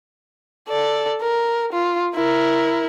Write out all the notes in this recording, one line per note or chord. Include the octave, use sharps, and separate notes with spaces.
A4 D5
A#4
F4
E4 A#4